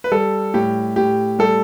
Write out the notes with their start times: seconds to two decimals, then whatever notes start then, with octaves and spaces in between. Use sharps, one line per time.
0.04 B4
0.12 G3 A4
0.54 A2 G4
0.96 A2 G4
1.39 G3 A4